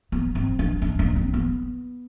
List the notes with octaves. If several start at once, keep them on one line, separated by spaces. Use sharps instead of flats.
B3
C4
D4
D4
D4
C4
B3